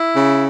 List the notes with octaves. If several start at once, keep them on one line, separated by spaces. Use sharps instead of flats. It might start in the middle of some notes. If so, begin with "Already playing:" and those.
Already playing: E4
C#3